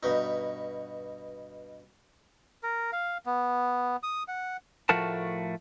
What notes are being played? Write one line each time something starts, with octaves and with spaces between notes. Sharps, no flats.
G2 B2 D#4
A#4
F5
B3
D#6
F#5
A2 F3 A3 F#4 A#4 A5